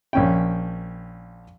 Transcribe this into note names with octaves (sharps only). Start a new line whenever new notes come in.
A#1 C#4 G5